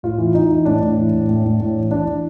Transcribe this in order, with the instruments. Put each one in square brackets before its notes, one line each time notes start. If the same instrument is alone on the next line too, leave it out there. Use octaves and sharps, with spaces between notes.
[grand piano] A2 F4
E3
E3 D#4
E3
A2 D4
A2
E3
A2
A2
A2
A2
E3
E3 D4
E3